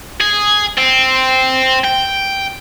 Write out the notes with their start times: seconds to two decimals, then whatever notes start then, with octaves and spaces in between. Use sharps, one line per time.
0.21 G#4
0.78 C4
1.84 G5